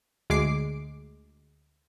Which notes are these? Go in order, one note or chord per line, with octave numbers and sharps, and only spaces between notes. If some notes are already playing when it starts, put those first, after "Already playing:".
D2 G#3 D6 C7